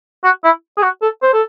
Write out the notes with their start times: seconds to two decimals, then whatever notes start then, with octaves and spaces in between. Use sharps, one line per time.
0.24 F#4
0.44 E4
0.77 G#4
0.82 F#4
1.02 A4
1.22 C5
1.33 A4